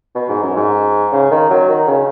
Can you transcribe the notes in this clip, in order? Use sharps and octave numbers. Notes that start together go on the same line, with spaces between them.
B2
G#2
F#2
G#2
C#3
D#3
F#3
D#3
C#3